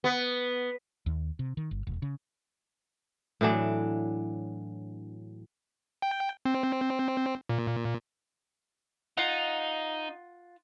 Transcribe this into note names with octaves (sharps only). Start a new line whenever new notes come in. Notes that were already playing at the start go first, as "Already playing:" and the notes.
B3
D#2
C3
D#3
G1
E1
C#3
A2 E3 F#3 D4
G5
C4
A#2
D#4 F4 F#5